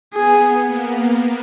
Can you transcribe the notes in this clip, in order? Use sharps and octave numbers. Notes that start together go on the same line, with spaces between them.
B3 G#4
A#3